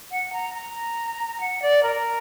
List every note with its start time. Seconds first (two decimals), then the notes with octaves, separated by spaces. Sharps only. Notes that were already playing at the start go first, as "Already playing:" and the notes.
0.11 F#5
0.33 A#5
0.54 A#5
1.41 F#5
1.62 D5
1.83 A#4